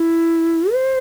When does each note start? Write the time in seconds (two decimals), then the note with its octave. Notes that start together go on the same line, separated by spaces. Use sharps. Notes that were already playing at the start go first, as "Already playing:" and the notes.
Already playing: E4
0.73 C5